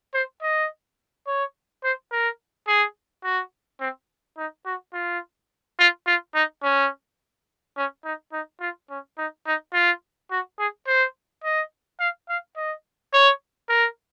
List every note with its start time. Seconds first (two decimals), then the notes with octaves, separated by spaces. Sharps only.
0.14 C5
0.42 D#5
1.27 C#5
1.84 C5
2.12 A#4
2.67 G#4
3.24 F#4
3.80 C4
4.37 D#4
4.66 F#4
4.93 F4
5.79 F4
6.07 F4
6.35 D#4
6.63 C#4
7.77 C#4
8.04 D#4
8.32 D#4
8.60 F4
8.90 C#4
9.18 D#4
9.46 D#4
9.74 F4
10.31 F#4
10.59 G#4
10.87 C5
11.44 D#5
12.00 F5
12.29 F5
12.56 D#5
13.13 C#5
13.69 A#4